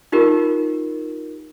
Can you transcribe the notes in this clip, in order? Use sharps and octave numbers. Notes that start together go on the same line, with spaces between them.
D#4 F4 G4 A#4